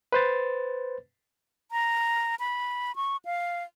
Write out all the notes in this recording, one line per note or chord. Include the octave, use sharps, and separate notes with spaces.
B4 C5 A6
A#5
B5
C#6
F5